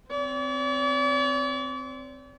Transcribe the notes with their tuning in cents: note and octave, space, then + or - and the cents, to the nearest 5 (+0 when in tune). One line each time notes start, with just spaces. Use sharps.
C4 -10 D5 -45